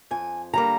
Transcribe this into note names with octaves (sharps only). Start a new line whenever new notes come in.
F2 G#5
D3 G3 A#3 A#5